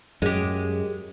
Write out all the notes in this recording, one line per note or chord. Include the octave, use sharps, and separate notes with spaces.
F#2 G#3 G4